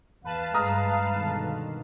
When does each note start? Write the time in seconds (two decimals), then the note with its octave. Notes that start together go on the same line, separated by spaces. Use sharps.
0.25 E2 B4 F5 A5
0.54 G2 G#3 A#5 D#6 F6
1.11 B2 D3 D#3